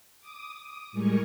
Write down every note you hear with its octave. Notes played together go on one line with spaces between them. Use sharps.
D6 D#6
A2 G3 G#3 A#4 G#5 C#6